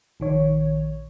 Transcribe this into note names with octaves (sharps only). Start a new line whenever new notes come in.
A#1 D#3 C#5